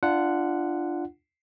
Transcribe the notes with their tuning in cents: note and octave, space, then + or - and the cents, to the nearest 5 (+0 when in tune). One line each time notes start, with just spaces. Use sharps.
D4 +10 F4 -25 F#5 +0